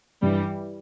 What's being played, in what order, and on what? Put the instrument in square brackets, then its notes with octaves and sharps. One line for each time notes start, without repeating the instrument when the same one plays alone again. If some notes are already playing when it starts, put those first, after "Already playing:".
[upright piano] G2 [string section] E3 G3